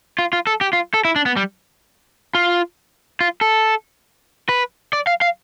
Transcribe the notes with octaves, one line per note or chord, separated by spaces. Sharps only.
F4
F4
A4
G4
F4
A4
E4
D4
B3
G3
F4
F4
A4
B4
D5
F5
F5